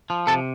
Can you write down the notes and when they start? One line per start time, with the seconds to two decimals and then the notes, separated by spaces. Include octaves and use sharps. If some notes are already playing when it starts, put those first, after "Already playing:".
0.10 F3
0.27 C3 A4 A5